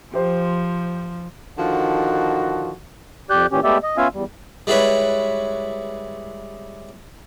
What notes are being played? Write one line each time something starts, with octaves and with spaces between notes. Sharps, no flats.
F3 G4 C5
D3 D#3 F3 F#4
F2 G4 D5 F#6 G6
A#2 E3 C#4 G4
G#3 A3 B3 G4 D5 E5
D#5
B3 C#4 F4 E5 F5 G#5
E2 G3
G3 G#3 E4 B4 C#5